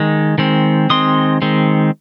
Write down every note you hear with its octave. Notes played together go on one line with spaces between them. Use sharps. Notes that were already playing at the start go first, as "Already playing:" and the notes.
Already playing: D#3 G#3
D#3 G#3 C4
D#3 G#3 C4 C6 D#6
D#3 G#3 C4